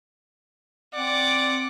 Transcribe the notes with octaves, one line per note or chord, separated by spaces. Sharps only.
C4 D5 F#5 D6